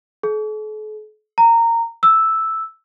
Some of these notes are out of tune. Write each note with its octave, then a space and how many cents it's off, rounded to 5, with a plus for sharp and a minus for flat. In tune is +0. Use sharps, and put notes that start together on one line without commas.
A4 -45
A#5 -15
E6 -5